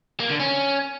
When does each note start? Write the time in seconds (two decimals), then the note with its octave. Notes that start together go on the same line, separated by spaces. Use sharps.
0.20 A#3
0.30 D3
0.40 C#4